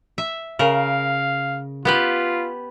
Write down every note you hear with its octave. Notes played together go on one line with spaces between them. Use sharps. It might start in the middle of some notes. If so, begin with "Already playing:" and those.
E5
C#3 A#4 F5
B3 F4 G4 B4